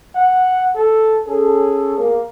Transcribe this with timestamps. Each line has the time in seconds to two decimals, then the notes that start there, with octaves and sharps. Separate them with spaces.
0.15 F#5
0.75 A4
1.27 C#4 G#4 A4
1.96 A#3